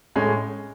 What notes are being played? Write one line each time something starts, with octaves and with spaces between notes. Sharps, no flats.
A2 G#3 C#4